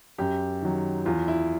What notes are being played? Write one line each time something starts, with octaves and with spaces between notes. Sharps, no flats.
F#2 G4
D#3 F#3
E2 F4
E4